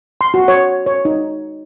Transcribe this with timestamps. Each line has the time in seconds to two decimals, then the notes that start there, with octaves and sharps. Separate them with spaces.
0.21 C6
0.34 F#4
0.48 C#5
0.86 C#5
1.05 D#4